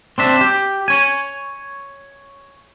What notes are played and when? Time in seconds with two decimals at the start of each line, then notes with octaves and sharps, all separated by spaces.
0.18 C4 D4 E5
0.41 G4
0.88 C#5 G#5